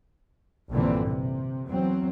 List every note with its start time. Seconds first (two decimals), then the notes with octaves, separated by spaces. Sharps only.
0.71 A#1 G2 A#2 D3 E3 C4
1.06 C3
1.67 E2 F#3 C4